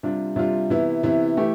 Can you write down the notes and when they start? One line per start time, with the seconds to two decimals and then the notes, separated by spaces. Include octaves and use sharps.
0.03 C3 G3 D4 F4
0.36 C3 G3 D4 F4
0.70 C3 E3 B3 E4
1.03 C3 E3 B3 E4
1.37 E3 A3 E4 G4